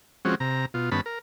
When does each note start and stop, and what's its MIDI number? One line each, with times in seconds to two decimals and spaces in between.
0.25 0.35 53
0.25 0.35 56
0.25 0.35 60
0.25 0.35 61
0.25 0.35 66
0.40 0.66 48
0.40 0.66 82
0.74 0.90 47
0.74 0.90 65
0.92 1.01 43
0.92 1.01 51
0.92 1.01 59
0.92 1.01 61
0.92 1.01 81
0.92 1.01 83
1.06 1.19 70